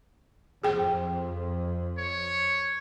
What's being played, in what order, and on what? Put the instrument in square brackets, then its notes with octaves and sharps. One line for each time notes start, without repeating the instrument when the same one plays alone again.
[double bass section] F2 [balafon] G#4 G5
[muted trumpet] C#5